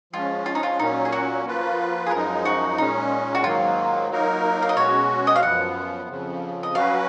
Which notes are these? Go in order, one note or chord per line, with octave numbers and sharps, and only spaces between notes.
F3 G#3 C#4 F4
F4
D#4
F4
A#2 F#3 A#3 C#4 D#4
G#4
F#4
F3 A#3 F4 B4
G#4
F#2 F3 G#3 D#4 A#4
F#4
A#2 G#3 C#4 D#4
F#4
G#2 D#3 F#3 A#3 F4
F#3 A#3 D#4 A#4
F5
D#5
B2 G#3 C#4 F#4 C#5
D#5
F5
F#2 F3 B3 F#5
F2 C#3 F3
D#5
F#3 C#4 F#4 B4 F5